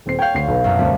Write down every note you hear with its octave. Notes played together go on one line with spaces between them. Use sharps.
D#1 C4 C7
C#5 F5 G5 G6
D2 C7
B1 B4
C2 F#2 A#2
D2 G3 C4 A5